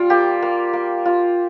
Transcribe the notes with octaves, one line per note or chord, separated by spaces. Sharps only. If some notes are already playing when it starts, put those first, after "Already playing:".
Already playing: G3 F4
A#3 G4
A#3
A#3
F4